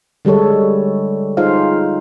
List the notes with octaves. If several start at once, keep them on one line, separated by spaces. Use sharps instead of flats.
D3 G3 G#3 A4 C#5
D#4 F4 G#4 C5 F5